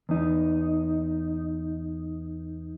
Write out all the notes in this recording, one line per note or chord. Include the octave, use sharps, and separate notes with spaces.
E2 D#4